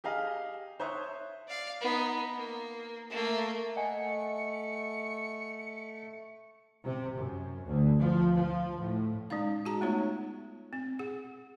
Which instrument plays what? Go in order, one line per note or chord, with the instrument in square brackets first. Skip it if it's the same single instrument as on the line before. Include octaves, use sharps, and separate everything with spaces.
[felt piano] G4 G#4 D#5 F5
C5 C#5 E5 C#6 D#6 F#6
[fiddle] D5 F5
B3 D#4
A#3
A3 A#3
[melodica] A3 [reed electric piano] D#5 F#5 G#5 [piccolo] C#7
[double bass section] C3
F#2
D2
F3
F3
A2
[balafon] G#3 C#4 D#4 F5
F#4 G#4 A5 A#5
A3 B3 D#4 F4 C#5
C4
G#4 F#5